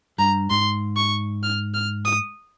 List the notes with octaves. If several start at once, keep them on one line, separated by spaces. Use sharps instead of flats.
G2 A#5
G#2 C6
C#6
F6
F6
D#6